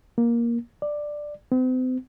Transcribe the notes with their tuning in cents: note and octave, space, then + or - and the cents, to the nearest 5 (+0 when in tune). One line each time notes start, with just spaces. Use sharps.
A#3 +10
D5 +10
C4 -40